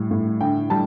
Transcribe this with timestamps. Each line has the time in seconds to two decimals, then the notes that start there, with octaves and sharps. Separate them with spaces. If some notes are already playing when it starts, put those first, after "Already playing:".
Already playing: A2 G3
0.11 A2
0.41 D3 G5
0.70 G3 A5